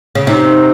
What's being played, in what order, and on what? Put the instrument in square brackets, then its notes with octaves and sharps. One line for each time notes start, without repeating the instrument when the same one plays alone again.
[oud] C#3
[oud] C3 [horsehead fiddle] D#4